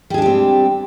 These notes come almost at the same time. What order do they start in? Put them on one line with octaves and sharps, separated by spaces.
G3 G#4 D4 G4 C4